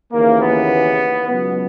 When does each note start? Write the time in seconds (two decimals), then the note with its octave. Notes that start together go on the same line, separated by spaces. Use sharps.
0.12 D#2 C#3 E3 A#3
0.42 B3
1.27 C#2 B2 F#3 B3